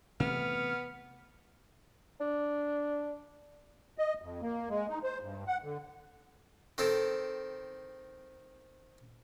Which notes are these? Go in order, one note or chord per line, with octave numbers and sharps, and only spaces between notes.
C3 E3 A3 B3 F6
D4
D#5
F2
A#3
G#3
D#4
C5
G2
F#5
D3
D#3 C4 A4